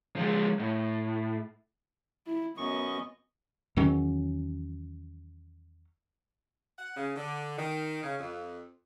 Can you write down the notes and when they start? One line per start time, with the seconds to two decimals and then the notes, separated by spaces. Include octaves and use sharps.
0.16 F3 G#3
0.60 A2
2.26 E4
2.57 F#2 B3 D#5 C#6
3.76 E2 D#3 F#3 C#4
6.77 F#5
6.96 C#3
7.16 D3
7.57 D#3
8.03 C#3
8.20 F2